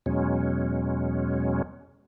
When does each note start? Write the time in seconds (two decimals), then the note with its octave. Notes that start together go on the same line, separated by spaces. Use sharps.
0.06 E2 B2 F#3 G#3 C#4